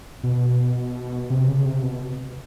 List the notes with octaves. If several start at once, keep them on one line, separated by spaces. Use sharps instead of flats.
B2
C3
C#3
C3
B2